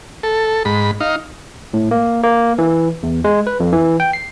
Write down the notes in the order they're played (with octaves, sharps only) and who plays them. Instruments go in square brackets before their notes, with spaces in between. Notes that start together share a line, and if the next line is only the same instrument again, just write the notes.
[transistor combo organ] A4
G#2 B5
D#4 F5
[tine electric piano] A2
A#3
A#3
E3
E2
G#3
B4
F2
E3
G5
C7